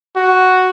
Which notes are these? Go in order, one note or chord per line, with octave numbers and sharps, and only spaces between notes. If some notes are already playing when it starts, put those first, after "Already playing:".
F#4